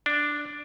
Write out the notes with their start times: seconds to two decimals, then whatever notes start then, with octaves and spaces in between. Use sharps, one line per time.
0.06 D4